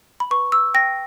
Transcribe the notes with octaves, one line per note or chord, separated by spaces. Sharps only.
B5
B4 C#6
E6
G5 A#6